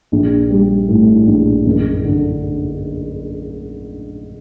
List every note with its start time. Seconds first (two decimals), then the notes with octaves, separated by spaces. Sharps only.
0.12 A#1
0.50 G3
0.88 A2
1.27 A#1
1.66 F#1
2.05 D3